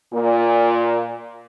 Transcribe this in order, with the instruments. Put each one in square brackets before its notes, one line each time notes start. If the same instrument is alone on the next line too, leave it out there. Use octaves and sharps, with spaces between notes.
[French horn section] A#2